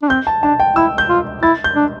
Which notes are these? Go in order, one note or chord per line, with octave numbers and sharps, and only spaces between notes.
D4
C4 G6
A5
D4 A5
G5
E4 E6
G6
F4
E4 A6
G6
D4